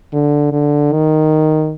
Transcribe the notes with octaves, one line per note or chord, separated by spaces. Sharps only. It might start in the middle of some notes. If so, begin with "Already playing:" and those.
D3
D3
D#3